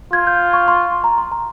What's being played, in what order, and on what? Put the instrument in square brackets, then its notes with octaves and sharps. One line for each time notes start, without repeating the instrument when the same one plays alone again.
[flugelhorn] F4 [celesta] G#6
[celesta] G6
C#6
C6
A#5
C6
A#5